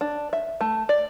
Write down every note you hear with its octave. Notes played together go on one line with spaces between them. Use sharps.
D4
E5
A3
D5